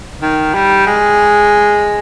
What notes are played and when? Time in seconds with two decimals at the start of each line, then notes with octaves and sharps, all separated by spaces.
0.22 D#3
0.54 G3
0.87 G#3